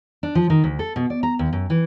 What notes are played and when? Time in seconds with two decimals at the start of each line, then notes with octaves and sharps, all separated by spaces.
0.23 D4
0.35 F3
0.50 D#3
0.64 D2
0.79 A4
0.96 B2
1.10 D5
1.23 A#5
1.39 D#2
1.53 F#2
1.70 E3